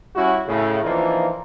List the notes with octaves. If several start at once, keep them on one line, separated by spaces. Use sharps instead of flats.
G3 C#4 E4 F#4
A2 C#3
E3 F3 A#3 D4 D#4 F4